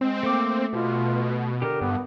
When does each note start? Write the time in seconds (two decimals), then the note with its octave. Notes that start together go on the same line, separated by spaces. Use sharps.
0.01 G#3 C4
0.23 A3 A#3 D6
0.73 B2 F4
1.62 D3 G4 A#4
1.81 G2 B3